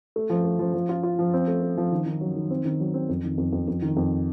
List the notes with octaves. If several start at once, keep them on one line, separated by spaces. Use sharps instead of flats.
A3
F3
A3
F3
F3
F4
F4
F3
C4
A3
A3
F3
D#3
D#3
F#3
D#3
C4
D#3
F#3
C4
F2
D#3
F2
F2
F2
D#3
F2